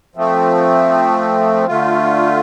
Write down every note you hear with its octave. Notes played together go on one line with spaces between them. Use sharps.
F3 A3 C4
D3 A3 F4